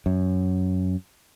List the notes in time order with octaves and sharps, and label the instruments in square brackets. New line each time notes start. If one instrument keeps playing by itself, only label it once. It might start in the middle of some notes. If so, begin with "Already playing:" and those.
[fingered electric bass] F#2